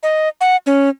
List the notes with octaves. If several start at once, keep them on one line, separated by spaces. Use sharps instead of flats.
D#5
F#5
C#4